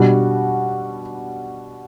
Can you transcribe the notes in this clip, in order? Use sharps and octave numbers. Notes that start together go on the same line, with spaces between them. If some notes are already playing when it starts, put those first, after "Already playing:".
Already playing: B2 G3 D4 F#4